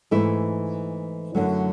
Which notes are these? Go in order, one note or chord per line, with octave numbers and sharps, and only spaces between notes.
G#2 E3 A3 E4
F#2 D3 F#3 A3